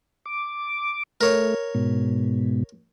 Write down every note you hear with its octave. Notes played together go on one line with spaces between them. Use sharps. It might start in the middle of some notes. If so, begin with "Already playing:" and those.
D6
A3 A#4 C#5
G#2 B2